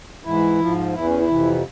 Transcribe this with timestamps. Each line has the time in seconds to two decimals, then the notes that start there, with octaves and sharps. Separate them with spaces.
0.24 G#2 E3 E4
0.59 G#2 F3
0.94 E2 E3 E4
1.06 C#4
1.19 E4
1.28 F2 C3 E3